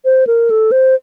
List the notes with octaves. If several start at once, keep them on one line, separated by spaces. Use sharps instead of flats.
C5
A#4
A4
C5